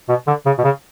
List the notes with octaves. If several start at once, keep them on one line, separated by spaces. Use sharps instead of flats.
B2
D3
C#3
B2
C#3